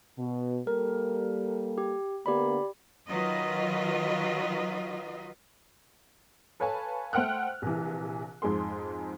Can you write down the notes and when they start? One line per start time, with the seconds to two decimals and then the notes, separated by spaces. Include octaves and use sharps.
0.18 B2
0.67 G3 A#3 A4 A#4
1.78 G4
2.26 D3 A#3 B3 G4 D5 B5
3.08 D#3 F#3 F4 B4 D#5
6.60 A4 B4 C#5 F5 G#5 A5
7.13 A3 C5 F#5 G5 F6 F#6
7.62 A#1 C3 E3
8.42 F2 G#2 G#3 G#4 C6